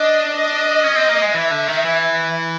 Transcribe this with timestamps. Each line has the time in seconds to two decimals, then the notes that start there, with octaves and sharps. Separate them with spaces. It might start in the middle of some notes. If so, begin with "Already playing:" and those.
Already playing: D4 D#5
0.33 D#5
0.84 C#4
0.96 C4
1.09 A#3
1.22 G#3
1.34 E3 E5
1.51 D3
1.68 D#3
1.85 E3